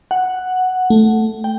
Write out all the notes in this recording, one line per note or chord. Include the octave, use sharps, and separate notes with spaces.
F#5
A3
G5